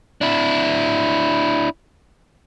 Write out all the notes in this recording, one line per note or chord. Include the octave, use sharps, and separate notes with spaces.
D4 E4